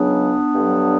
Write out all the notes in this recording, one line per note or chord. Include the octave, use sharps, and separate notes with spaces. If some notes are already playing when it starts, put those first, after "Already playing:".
Already playing: C#2 C#3 F#3 B3 D4
G2 D3 F#3